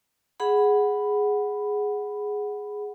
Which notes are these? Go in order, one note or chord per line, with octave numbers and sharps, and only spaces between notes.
G#4 F#5 B5